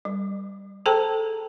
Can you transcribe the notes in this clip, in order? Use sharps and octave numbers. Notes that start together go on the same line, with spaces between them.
G3
G#4 A4 C5 G5 A5 A#5